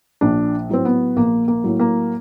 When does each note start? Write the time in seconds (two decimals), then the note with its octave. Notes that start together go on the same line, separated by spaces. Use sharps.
0.21 A#1 D4
0.69 A2 F#3 C4
0.85 B3
1.16 A#1 A#3
1.48 A#3
1.64 A2 F#3
1.79 A#3